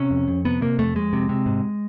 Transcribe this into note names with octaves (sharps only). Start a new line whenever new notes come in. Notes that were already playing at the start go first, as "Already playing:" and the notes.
Already playing: C3 C#4
F2
F2
C3 B3
C3 A#3
F2 A3
F2 G#3
C3
C3
G#2